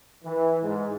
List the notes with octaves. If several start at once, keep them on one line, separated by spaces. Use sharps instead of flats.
E3
G#2